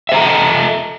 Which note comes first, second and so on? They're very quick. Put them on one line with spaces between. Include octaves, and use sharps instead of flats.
E5 C5 A#5 A4 D#5